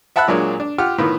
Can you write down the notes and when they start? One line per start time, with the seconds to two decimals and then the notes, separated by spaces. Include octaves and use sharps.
0.16 E5 F#5 A5 B5 E6 F#6
0.28 A#2 F#3 G#3 A#3 D4
0.60 D4
0.78 F4 G4 F#5 F6
0.98 A2 D#3 B3 F4